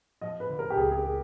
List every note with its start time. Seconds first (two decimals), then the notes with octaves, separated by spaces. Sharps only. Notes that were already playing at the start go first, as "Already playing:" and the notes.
0.21 F3 D#5
0.40 B4
0.50 D3
0.59 A#4
0.70 G4
0.77 C#2 G#4
0.91 G#4
1.05 G#4